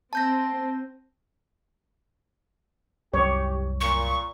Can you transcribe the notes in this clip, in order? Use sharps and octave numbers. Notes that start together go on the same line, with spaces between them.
C4 A5 G6 A#6
C2 F#2 G3 G4 C#5
A#2 C#6